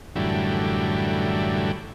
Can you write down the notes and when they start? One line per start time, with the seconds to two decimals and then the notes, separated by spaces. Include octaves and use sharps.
0.16 F#2 A2 D3 E3 G3